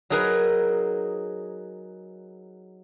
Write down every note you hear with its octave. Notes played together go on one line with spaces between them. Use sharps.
F#3 D#4 G#4 A#4 B4